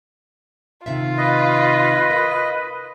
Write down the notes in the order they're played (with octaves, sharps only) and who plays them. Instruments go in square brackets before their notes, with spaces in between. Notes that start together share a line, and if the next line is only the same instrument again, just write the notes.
[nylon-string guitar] C3 D#3 E5 [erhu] F4
[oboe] B4 [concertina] D#5
[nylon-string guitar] A#4